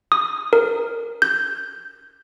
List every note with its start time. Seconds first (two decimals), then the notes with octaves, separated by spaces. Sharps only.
0.12 D#6
0.53 A#4
1.22 G6